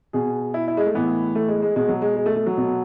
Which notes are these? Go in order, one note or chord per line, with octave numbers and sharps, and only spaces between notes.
B2 G#4
E4
E4
G#3
A3
A2 E3 B3
A3
G#3
G#3
B2 G#3
F#3
G#3
G#3
A3
A3
F#3
B2